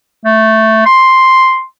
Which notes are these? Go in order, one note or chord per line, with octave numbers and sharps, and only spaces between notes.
A3
C6